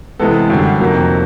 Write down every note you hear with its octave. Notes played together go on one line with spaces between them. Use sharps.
C3 E3 G#3 B3 A4
F#2 D3 G3
F2 C3 D#3 F#3 A#3